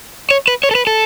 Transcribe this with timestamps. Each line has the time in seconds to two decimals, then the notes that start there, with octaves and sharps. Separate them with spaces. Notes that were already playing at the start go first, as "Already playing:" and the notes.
0.31 C#5
0.48 B4
0.63 C#5
0.71 A4
0.75 B4
0.87 A4